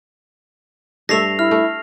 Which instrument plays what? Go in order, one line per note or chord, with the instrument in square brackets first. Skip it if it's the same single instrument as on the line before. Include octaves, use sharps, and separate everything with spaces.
[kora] G2 A3 E5 [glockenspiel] A#6 C7 F7
[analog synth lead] E4 [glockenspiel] F6
[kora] A3